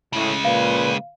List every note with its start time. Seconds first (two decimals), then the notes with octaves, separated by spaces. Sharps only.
0.13 A2 C#3 G#3
0.45 A#2 F3 B4 F5